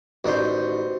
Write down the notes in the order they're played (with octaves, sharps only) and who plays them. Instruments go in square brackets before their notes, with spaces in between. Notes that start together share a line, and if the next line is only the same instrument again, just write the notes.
[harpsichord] A1 D#3 D5 [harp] F#4 C5